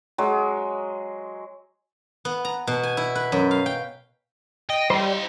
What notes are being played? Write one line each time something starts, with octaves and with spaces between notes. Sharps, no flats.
F#3 G#3
B3
A#5
B2
G#5
E4
B4
F#2
F5
G5
D#5 G5
G3 E4 C5 D#5